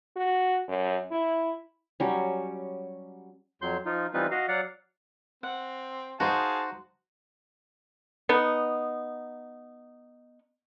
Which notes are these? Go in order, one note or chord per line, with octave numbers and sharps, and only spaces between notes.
F#4
F#2
E4
F#3 G3 C#4
F2 F#3 C6 G6
F3 D#4 F4
E3 G3 C4 D#4 F4 B4
F#4 D#5 F5
F#3 D5 F5 F#5
C4 F#5
D#4 F#4 G#4 C5 F5 A5
B3 D#4